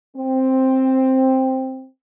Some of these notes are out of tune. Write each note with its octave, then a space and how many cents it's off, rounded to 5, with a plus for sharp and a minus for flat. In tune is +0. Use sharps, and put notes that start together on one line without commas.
C4 +5